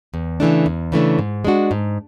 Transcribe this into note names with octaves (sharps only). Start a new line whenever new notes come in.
E2
C#3 E3 A3 D4
E2
C#3 E3 A3 D4
G#2
G#3 D4 F#4
G#2